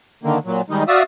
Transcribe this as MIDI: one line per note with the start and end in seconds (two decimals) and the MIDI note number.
0.23 0.39 50
0.23 0.39 51
0.23 0.39 58
0.45 0.61 46
0.45 0.61 54
0.70 0.84 51
0.70 0.84 55
0.70 0.84 56
0.70 0.84 63
0.88 1.03 66
0.88 1.03 74
0.88 1.03 76
0.88 1.03 77
0.88 1.03 87
0.88 1.03 88